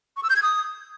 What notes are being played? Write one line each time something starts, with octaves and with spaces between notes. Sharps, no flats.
C#6
E6
G6
G#6
D#6